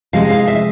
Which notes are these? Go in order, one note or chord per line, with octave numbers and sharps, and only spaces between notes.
C3 F3 G#3 F5
F5
E5